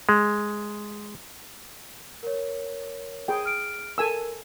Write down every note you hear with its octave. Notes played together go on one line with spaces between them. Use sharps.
G#3
A#4 C#5
G#4 G5
F6 D7
A4 A#4 G#5 E6